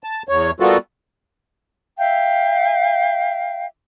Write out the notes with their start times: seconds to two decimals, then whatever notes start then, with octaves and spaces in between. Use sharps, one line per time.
0.04 A5
0.29 E2 C#5
0.60 G3 A#3 B3 F4 F#4 A4
1.98 E5 F5 G5